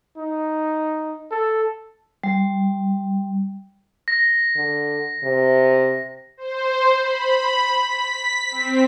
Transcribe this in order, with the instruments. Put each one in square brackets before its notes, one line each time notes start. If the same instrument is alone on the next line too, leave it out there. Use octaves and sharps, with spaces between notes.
[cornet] D#4
A4
[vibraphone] G3
[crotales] A#6
[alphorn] D3
C3
[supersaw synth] C5
B5
B6
C4